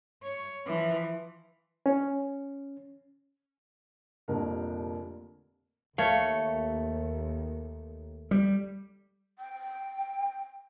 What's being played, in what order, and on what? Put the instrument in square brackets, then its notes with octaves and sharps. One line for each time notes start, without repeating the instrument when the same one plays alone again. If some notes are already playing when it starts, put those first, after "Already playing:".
[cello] C#5
E3 F3
[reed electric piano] C#4
[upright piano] F1 C2 F2 A#2 D3 A#4
[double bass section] D#2 [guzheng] A3 C#5 [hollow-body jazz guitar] F5
[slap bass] G3
[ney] G5